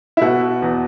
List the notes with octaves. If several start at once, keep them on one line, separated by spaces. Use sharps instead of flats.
E4
B2 F#4
E2